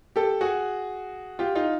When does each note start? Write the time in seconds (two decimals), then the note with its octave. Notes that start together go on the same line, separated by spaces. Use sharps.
0.16 G4 A4
0.41 F#4 G#4
1.39 F4 G4
1.55 D#4 F4